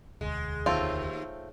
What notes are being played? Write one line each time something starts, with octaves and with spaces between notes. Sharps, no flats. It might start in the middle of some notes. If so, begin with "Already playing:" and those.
E1 D2 G#3
D#2 A3 C4 F4